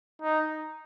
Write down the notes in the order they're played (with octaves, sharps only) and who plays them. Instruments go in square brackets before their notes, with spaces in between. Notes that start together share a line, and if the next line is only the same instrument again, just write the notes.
[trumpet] D#4